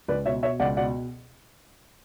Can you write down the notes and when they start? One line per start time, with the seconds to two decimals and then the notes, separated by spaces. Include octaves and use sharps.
0.08 C#2 B4 D5
0.26 B2 C#5 E5
0.43 B2 C#5 E5
0.60 C#2 D5 F#5
0.77 B2 D5 F#5